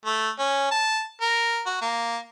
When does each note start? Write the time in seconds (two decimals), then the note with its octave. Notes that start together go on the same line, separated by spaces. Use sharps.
0.05 A3
0.39 C#4
0.71 A5
1.21 A#4
1.66 F#4
1.82 A#3